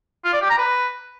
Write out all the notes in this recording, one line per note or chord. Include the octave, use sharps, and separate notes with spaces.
F4
D5
G4
A#5
B4